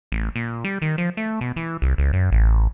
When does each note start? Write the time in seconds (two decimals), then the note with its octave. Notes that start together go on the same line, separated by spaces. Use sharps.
0.12 A1
0.36 A#2
0.64 G3
0.82 D#3
0.98 F3
1.17 A3
1.41 B2
1.56 E3
1.82 C2
1.98 C#2
2.13 F#2
2.32 A1